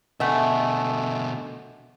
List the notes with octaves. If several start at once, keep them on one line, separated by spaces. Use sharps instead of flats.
B2 D3 A3 D#5 E5 F#5 G#5